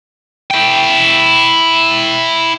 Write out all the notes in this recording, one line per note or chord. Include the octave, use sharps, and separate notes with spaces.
E4 G5